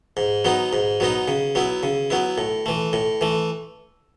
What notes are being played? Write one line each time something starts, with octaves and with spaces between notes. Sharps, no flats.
G#2
F#3 B3 D#4
G#2
F#3 B3 D#4
C#3
F#3 B3 E4
C#3
F#3 B3 E4
A2
E3 A3
A2
E3 A3